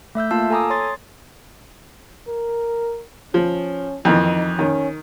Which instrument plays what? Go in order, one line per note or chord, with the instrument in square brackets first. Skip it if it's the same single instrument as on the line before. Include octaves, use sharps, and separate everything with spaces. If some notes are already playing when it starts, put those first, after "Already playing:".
[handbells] A3 E5 E6 G6
A#3 F4 F5 A5 E6
A4 G#5 A#5 D6 D#6
C#5 C6 A6
[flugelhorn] A#4
[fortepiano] F3 [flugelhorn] C#4
[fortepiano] F2 D#3 E3 [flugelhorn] D#4
[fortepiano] D#3 [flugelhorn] C#4